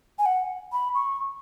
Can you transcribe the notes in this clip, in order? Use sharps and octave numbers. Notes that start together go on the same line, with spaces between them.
G#5
F#5
B5
C#6